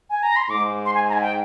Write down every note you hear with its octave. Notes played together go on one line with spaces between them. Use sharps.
G#5
A#5
C6
G#2 D6
C6
G#5
A#5
G#5
G5